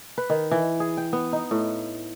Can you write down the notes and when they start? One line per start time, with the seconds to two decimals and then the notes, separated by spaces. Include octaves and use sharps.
0.18 B4
0.30 D#3
0.51 E3
0.80 G#4
0.97 G5
1.13 B3
1.33 D#4
1.51 A2